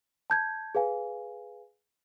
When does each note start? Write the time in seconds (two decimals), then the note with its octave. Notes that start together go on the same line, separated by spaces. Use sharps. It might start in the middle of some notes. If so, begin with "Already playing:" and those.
0.30 A5 G6 G#6
0.75 G#4 B4 F5 G#5